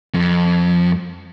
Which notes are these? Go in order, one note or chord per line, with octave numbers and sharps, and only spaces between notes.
F2